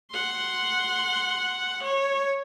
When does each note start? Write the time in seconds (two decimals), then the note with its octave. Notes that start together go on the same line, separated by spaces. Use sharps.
0.12 F#5 C6
1.84 C#5